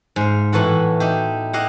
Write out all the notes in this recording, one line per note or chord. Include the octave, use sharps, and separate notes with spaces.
G#2 F5
A2 E3 B3 F#4 A4 F#5
D#4 E4 G4
E4 G4 D#5 F5 F#5